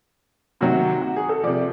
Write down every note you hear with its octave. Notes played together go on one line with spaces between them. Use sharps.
C3 D#3 F#3 F#4
F#4
G#4
A4
C3 F3 D5